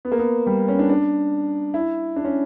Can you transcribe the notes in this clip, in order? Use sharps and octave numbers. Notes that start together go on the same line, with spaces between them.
B3
A#3
B3
G3
C#4
D4
D4
E4
D4
C#4